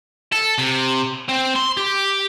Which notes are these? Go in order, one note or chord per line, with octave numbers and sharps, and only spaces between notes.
A4
C3
C4
C6
G4